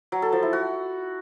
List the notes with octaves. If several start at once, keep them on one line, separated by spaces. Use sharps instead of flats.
F#3
A4
F3
E4
F#4